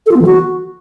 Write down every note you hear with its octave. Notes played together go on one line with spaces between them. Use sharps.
A4
F4
B3
E3
F#4